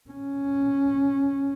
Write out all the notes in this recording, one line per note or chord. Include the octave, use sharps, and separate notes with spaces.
C#4